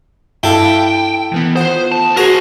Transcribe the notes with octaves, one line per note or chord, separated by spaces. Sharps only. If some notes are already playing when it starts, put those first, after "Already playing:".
G2 E4 A4 F5 G5
D#3 E3 B3
F4 C5 F#5 D#6
D2 A5
F#4 G#4 A#4 C5